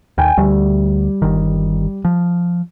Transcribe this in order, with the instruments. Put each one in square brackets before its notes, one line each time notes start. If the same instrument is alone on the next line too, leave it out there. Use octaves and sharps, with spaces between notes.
[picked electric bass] D#2 [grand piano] G5 G#5
[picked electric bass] D2 [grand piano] G3
[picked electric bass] G1 D#3
F3